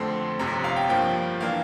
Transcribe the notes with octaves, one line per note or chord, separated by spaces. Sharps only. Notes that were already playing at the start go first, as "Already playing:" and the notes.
Already playing: F2 D3 A3 C4 C6
G1 F2 C3 A#5
F5
G5
G2 F3 A#3 G5
E3 A#3 D4 F5